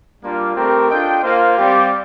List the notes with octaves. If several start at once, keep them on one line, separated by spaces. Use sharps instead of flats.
G3 A#3 D4 F4
A3 C4 G4 A#4
D4 F4 A4 D#5 G5
A#3 F4 C5 F5
G3 C4 G4 D5 F5